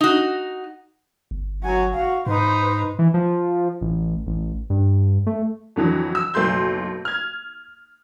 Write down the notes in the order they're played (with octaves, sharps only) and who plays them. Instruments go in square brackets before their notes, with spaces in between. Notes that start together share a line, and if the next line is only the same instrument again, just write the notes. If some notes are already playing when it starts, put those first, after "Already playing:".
[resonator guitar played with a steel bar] D#4 F#4
[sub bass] G1
[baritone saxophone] F#3 [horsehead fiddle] F#4 G#5
[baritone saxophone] F#4 [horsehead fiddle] F5
[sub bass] G#2 [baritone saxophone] D#4 [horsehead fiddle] B4 C5
[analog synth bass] E3
F3
A1
A1
G2
A3
[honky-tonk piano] F2 D3 E3 F#3
E6
F#1 B1 A3 C6 G6
F6 G#6